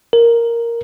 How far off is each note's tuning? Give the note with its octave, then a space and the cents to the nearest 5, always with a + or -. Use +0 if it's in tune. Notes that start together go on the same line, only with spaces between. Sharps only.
A#4 +0